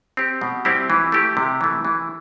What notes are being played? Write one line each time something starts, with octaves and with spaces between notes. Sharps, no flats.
C4 G4
B2
G3 C4 E4 G4
E3
A3 E4 G4
C3
E3 A3
E3